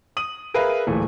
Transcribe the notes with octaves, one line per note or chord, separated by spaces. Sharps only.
D#6 D#7 F#7
G#4 A#4 B4 E5 F5
D1 A#2 E3 A3